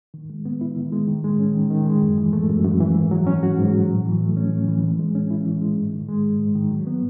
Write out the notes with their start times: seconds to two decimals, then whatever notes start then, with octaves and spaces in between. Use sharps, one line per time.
0.14 D#3
0.30 G#3
0.46 B3
0.61 E4
0.76 D#3
0.92 G#3
1.08 D#3
1.24 G#3
1.39 C#4
1.54 D#3
1.70 D#3
1.86 G#3
2.02 F#2
2.18 E3
2.33 A3
2.49 F#2
2.64 F#2
2.80 E3
2.96 G#2
3.11 F#3
3.27 C#4
3.43 F#4
3.58 G#2
3.73 F#3
3.89 A2
4.05 E3
4.21 A3
4.37 C#4
4.53 A2
4.68 E3
4.84 E3
4.99 G#3
5.15 C#4
5.31 E4
5.46 E3
5.61 G#3
5.77 G#2
5.93 D#3
6.08 G#3
6.24 G#2
6.40 G#2
6.55 D#3
6.71 F#3
6.87 B3